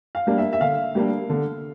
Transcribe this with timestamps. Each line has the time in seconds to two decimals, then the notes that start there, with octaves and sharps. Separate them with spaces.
0.15 F5
0.27 G3 A#3 D4
0.38 E5
0.53 E5
0.61 D3 F5
0.95 G3 A#3 D4
1.29 D3